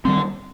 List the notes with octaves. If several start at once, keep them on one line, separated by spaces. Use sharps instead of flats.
D3 D#3 G3 C4